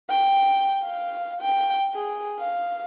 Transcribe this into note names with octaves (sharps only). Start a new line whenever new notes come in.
G5
F5
G5
G#4
F5